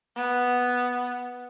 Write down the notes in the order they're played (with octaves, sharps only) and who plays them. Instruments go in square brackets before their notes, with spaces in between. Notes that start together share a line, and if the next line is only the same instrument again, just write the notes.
[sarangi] B3